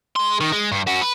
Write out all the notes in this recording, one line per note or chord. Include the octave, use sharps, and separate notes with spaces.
G#3 C6
D#3
G#3
G2
C#4 F#4
B4